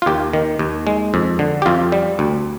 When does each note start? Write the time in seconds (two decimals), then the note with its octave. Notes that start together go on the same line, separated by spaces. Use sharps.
0.02 F4
0.06 D#2 G4
0.33 D#3
0.59 D#2
0.87 G#3
1.14 F2
1.39 D3
1.62 G4
1.66 F2 F4
1.92 G3
2.19 D2